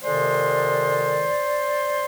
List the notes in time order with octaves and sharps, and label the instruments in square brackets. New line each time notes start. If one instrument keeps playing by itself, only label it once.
[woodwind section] F2 C3 D#3 G#3 C5 D5